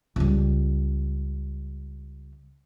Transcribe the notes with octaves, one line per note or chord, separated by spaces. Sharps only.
C#2 G3